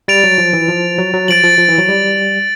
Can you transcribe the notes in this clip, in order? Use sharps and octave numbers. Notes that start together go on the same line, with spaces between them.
G3 A6 D7 F7
F#3
F3
E3
F3
F#3
F#3
F3 A6 D7 F#7
F3
F3
E3
F#3
G3